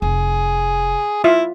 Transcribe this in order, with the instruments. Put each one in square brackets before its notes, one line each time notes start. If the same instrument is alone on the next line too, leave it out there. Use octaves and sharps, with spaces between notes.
[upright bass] F1 [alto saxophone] G#4
[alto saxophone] E4 [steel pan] F4 E5